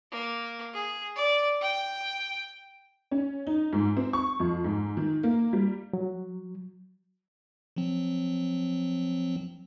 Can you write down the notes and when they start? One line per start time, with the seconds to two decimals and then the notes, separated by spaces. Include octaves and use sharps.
0.12 A#3
0.74 G#4
1.16 D5
1.61 G5
3.11 C#4
3.47 D#4
3.73 G#2
3.97 C4
4.13 C#6
4.40 F2
4.64 G#2
4.97 D#3
5.23 A#3
5.53 G3
5.93 F#3
7.76 F3 F#3 C4